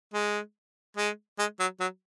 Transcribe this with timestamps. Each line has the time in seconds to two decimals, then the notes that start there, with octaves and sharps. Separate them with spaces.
0.14 G#3
0.97 G#3
1.39 G#3
1.60 F#3
1.80 F#3